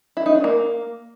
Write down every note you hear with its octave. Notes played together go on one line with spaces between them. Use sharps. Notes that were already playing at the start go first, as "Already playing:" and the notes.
E4
D#4
D4
A#3